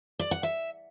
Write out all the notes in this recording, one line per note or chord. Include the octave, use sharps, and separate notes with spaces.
D5
F#5
E5